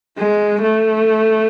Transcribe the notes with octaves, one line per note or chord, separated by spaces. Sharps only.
G#3
A3